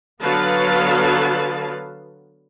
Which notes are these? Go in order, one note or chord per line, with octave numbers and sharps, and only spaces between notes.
D3 F#3 B3 B4 F5 A5